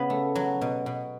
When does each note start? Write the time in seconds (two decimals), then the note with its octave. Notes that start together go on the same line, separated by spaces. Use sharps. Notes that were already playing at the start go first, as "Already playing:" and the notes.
Already playing: C#3 B3 C#4 B4
0.10 A3
0.35 F#3
0.61 B2
0.86 B2